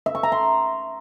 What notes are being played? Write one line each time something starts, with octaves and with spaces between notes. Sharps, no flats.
E5
C#6
A#5
C6